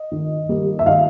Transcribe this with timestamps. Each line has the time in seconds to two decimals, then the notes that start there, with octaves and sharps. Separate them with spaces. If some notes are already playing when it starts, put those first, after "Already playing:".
Already playing: D#5
0.12 D#3
0.49 G3 A#3
0.79 E5
0.86 D#3 D#5 F5